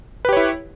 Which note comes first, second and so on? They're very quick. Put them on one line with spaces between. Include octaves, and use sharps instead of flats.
B4 G4 C#5 E4